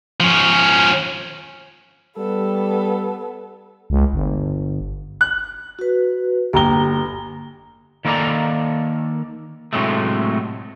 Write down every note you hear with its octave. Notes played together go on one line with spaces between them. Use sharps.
F3 C#4
G3 B3 A4
C#2
G1
F#6
F#4 B4
G1 A#3 G4 A#5 G7
D#3 A#3 A4 A#4 D5 A#5
A2 C3 F#3 G#3 A3